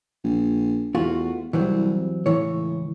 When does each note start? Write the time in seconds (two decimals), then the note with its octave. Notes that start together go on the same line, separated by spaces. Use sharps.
0.24 A#1
0.95 E2 A3 F4 F#4
1.53 C2 E3 F#3 C4
2.26 C#2 A2 E3 C#5